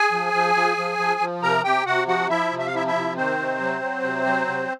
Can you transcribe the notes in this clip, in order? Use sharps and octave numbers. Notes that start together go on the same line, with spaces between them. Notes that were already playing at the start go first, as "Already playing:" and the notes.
Already playing: G#4 G#5
F3
F3
F3
F3
F3
F3
C3 A#4 A#5
C3 G4 G5
C3 F#4 F#5
F3 F#4 F#5
F3 E4 E5
C3
E5
F5
F3 E4 E5
E4 E5
C3
D#3 C4 C5
C3
F#3
F#3
C3
F#3
C3